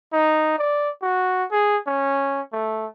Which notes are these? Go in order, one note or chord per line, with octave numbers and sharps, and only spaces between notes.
D#4
D5
F#4
G#4
C#4
A3